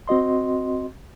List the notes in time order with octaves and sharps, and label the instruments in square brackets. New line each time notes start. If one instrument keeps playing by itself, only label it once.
[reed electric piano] C4 F#4 D#5 C6